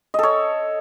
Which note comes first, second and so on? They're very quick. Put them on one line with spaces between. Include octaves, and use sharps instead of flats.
D#5 A4 C#5